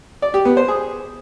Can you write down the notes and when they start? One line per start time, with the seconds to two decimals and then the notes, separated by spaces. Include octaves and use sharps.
0.22 D5
0.34 G4
0.45 B3
0.57 C5
0.68 G#4